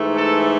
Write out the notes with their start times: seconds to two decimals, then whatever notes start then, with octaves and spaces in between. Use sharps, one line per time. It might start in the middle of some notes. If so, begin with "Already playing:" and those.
Already playing: G#2 E3 A3
0.17 A4